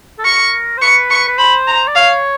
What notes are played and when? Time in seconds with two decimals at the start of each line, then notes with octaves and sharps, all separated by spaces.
0.19 A4
0.25 A#4 C#6
0.77 C5
0.81 B4 C#6
1.10 C#6
1.28 B4
1.38 C5 B5
1.67 A#5
1.88 D5
1.96 C#5 F5